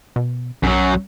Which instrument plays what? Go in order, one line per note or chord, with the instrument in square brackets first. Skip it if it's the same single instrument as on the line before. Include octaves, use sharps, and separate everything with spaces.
[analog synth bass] B2
[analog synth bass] B1 [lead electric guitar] F#2 F#3